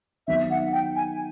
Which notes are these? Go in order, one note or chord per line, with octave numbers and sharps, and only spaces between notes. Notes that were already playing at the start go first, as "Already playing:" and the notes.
D#3 F#3 B3 E5
F#5
G5
G#5